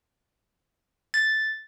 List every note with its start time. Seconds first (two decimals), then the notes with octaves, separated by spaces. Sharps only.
1.14 A6